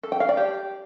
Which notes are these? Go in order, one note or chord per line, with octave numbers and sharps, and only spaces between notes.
A4
G5
F5
D5
G4